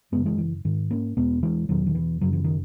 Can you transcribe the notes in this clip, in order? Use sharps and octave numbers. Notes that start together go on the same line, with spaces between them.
F#2 C#3 G#3 B3
E3 G#3
E3
G#2 D#3
A#3 C#4
E2 B2 G#3 B3
E3 G#3
E2 B2 D#3 F#3
D#3
E3
F#2 C#3 F#3
E3
D#3